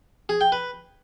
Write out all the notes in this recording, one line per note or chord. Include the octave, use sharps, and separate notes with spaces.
G#4
G5
B4